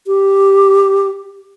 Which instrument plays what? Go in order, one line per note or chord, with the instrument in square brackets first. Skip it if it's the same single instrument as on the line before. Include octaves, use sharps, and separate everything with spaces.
[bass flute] G4